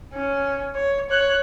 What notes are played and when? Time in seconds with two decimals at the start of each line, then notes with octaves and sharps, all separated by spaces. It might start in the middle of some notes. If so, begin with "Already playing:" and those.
0.13 C#4
0.75 C#5
1.10 C#5 F#6